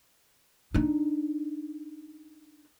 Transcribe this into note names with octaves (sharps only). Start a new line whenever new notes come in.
D4 D#4